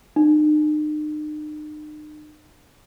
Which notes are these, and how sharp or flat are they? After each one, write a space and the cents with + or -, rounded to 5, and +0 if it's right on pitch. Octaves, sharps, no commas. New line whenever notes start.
D#4 -45